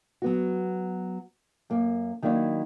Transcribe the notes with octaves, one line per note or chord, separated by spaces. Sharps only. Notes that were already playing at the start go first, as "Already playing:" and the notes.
F#3 B3 F#4
F#2 A#3
D#3 F#3 A#3 D4 E4